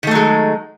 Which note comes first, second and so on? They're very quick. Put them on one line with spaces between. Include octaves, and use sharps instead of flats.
D#3 A3 F#3 G#3